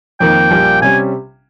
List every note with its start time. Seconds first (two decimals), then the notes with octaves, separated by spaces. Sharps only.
0.20 F2 D#3 A#3 G5
0.50 A#1 A#2 G3
0.82 C3 G3 C#4 G#5